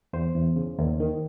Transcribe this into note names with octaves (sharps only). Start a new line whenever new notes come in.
E2 C5
E2
C#3
D#2
D#3